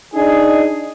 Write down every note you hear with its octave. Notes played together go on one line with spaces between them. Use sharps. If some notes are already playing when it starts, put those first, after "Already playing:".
D4 D#4 G#4